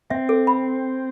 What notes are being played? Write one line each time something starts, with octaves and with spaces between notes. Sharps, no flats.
C4 E5
A4
B5